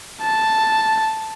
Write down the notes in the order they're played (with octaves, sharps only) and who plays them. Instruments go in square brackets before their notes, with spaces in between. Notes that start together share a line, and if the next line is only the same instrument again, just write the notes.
[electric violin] A5